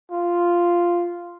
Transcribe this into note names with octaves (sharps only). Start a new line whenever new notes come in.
F4